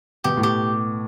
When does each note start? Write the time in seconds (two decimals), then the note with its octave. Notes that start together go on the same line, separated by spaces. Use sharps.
0.24 B2 G4
0.37 A2
0.43 G4